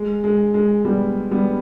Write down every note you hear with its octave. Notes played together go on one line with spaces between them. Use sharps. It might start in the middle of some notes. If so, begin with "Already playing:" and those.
Already playing: G#3
G#3
G#3
G3 B3
G3 B3